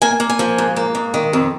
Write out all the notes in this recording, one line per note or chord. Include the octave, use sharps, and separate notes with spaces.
A#3 G#5
A#3
G#5
F3
G#2
A#3
G#2
D#3
F2